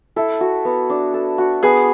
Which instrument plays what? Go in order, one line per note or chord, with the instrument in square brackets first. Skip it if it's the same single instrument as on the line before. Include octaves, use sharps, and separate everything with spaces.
[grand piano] E4 [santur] A4
[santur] F#4
B3
D4
A4
F#4
[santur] B3 [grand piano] G#4